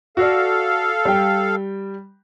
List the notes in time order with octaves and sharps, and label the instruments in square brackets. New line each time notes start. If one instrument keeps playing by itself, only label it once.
[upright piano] F#4 D5 [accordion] A4 F5
[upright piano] G3 G5